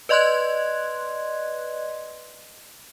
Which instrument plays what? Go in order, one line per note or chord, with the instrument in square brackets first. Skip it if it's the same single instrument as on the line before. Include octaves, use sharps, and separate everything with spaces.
[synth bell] B4 D5 D#5 C6 F#6 G#6